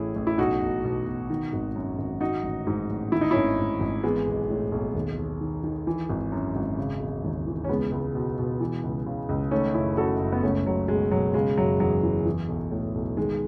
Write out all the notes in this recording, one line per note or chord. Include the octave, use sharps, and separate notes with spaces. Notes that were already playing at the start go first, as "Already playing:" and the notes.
Already playing: A1 A2 E3 E4 G#4
A1
E4
B1 D#4 F#4
B1
B2
B2
D#3
G#1
F#2
G#1
D#3 D#4 F#4
A1
G#2
A1
D#3 E4
D#4
G#1 C#4 E4
G#2
G#1
E3 G#3 B3
B1
A2
B1
D#2
D#2
D#3
D#3
E3
G#1
F#2
G#1
C#3
E1
D#2
E3
C#4
C#2 G#3 B3
C#2
B2
B2
E3
C#2
C#3
C#2
D#3 A3 C#4
F#1 C#4 E4
F#2 F#4 A4
F#1
B3
C#2 A3 C#4
C#2 F#3
B2 G#3
B2 F#3
C#3 G#3
F#1 F#3
E2 F#3
E3
E3
B1
A2
B1
D#3 G#3